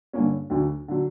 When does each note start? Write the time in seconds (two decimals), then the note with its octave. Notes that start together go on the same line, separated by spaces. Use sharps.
0.13 G2 D3 A#3 C#4
0.50 D2 D3 F#3
0.88 D3 F#3